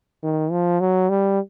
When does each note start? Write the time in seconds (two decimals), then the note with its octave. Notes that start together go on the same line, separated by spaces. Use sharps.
0.23 D#3
0.51 F3
0.80 F#3
1.09 G3